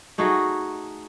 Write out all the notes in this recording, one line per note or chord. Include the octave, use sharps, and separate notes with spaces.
A3 D#4 F#4 G#4